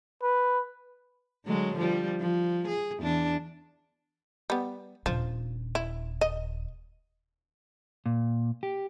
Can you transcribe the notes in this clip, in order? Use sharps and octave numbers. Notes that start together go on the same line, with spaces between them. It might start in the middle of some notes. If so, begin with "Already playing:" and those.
B4
D3 F#3 G#3
F3 G3
F3
G#4
E2 D4
G3 B3
D#1 F3 D4
E4
D#5
A#2
G4